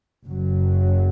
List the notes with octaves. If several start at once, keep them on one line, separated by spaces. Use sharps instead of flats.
F#1 F#2 F#3